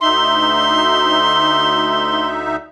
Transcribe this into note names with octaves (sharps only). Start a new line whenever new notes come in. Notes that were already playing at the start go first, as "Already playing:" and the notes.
D2 D#4 E5 C6